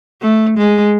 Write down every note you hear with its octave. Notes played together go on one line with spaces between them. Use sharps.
A3
G#3